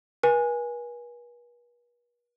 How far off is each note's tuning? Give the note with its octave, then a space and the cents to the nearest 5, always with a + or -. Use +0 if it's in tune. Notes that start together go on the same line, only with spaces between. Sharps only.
B4 -45 G#5 -5